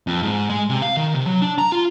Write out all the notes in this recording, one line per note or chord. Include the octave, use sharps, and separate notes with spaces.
F2
G#2
G#3
C3
F5
D#3
C3
F#3
D4
A#5
F4